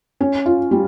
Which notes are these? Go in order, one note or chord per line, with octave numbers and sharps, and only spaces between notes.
C#4
F4
G3